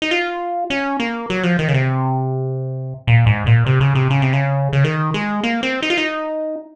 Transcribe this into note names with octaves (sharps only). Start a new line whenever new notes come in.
D#4
F4
C#4
A#3
F#3
F3
D#3
C#3
C3
A#2
G#2
A#2
C3
C#3
C3
C#3
C3
C#3
C#3
D#3
G#3
A#3
C4
D#4
F4
D#4